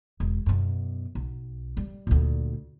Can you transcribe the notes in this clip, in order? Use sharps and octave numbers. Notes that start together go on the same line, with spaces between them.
E1
F#2 B2
B1
G3
D2 A#2